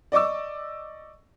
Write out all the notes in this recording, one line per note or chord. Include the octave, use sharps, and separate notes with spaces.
D5 D#5 C#6 D6 E6